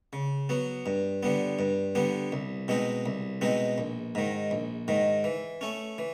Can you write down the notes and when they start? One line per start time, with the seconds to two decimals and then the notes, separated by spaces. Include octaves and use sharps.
0.13 C#3
0.49 F#3 B3
0.86 G2
1.23 D3 G3 B3
1.59 G2
1.95 D3 G3 B3
2.32 C2
2.68 B2 G#3 C4 D#4
3.06 C2
3.41 B2 G#3 C4 D#4
3.78 A#1
4.15 G#2 D#3
4.51 A#1
4.88 G#2 D#3
5.24 E3
5.61 A3 C#4
5.98 E3